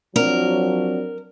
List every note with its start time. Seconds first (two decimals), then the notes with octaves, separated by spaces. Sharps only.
0.16 F3 F#3 C4 D4 A#4 D5